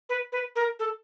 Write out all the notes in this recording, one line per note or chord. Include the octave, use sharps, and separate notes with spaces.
B4
B4
A#4
A4